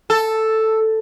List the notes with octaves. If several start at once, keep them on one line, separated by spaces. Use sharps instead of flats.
A4